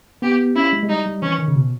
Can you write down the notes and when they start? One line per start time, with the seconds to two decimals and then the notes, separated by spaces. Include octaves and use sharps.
0.22 B3 G4
0.56 C#4 E4
0.73 G#3
0.83 G#3
0.89 G3 D#4
1.06 G3
1.22 E3 C#4
1.38 D#3
1.48 C#3
1.56 B2